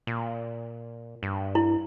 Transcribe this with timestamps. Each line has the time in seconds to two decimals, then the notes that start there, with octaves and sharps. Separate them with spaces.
0.07 A#2
1.23 G2
1.55 E4